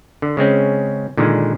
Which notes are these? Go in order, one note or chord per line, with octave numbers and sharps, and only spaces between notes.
D3
C#3 G#3 C4 C#4
A#2 D3 D#3 G#3